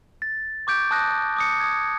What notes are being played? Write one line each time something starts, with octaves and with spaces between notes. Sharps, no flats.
A6
C#6 D6 G6 D7
A5 D#6 F#6 A#6
D6 D#6 C#7
D#6 G#6